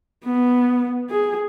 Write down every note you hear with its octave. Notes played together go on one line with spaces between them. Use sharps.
B3
G#4